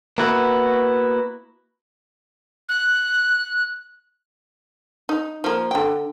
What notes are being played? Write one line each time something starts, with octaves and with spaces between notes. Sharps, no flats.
A#3 B3 E4 F#4 B4
F#6
D#4
F3 A#3
D3 G5